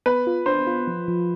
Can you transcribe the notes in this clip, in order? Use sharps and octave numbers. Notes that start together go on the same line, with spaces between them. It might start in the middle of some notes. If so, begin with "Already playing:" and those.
B3 B4
F4
D4 C5
F4
F3
F3